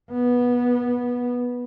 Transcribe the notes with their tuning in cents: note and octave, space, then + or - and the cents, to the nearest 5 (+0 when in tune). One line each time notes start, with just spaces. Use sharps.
B3 -15